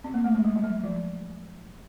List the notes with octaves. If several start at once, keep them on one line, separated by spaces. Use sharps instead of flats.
C4
A#3
A3
G#3
G3
G3
F#3
F3